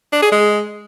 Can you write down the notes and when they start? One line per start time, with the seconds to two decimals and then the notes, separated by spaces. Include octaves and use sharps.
0.13 D4
0.22 G#4
0.32 G#3